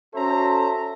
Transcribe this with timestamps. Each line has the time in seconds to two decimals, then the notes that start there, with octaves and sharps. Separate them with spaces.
0.15 C#4 F#4 A4 C5 E5 A#5